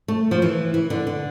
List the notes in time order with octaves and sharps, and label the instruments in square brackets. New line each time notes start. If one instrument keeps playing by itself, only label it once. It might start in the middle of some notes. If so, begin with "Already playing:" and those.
[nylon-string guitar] A3
F3
E3
E3
D3
D3